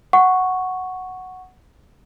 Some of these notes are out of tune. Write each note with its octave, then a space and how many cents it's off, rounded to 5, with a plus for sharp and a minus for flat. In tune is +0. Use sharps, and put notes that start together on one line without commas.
F#5 +0 C#6 +0